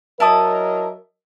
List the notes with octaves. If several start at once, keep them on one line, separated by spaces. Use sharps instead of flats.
F#3 E4 A#4 D#5 A5 D#6